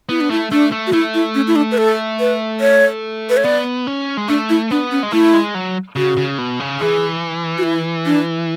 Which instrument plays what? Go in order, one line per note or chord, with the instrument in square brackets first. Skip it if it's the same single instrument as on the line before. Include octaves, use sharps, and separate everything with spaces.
[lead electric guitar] B3 [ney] E4
[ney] D4
[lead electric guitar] A3 [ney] E4
[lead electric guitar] A3 [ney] D4
[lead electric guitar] A3
[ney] F#4
[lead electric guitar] A3 [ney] E4
[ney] E4
C#4
E4
D4
B4
A4
B4
C#5
B4
C#5
[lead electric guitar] B3 [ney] D5
[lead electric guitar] C#4
G#3
[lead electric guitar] A3 [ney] D4
[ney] E4
[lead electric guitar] B3 [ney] D4
[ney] C#4
[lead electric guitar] G#3
[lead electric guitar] A3 [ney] E4
[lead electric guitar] G#3
F#3
[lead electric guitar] C#3 [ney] F#4
[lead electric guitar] C#3
B2
C#3
[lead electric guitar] E3 [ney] G#4
[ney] F#4
E4
D4